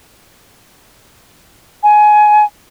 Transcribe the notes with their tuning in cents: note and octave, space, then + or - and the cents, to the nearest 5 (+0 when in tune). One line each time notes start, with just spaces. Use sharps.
G#5 +20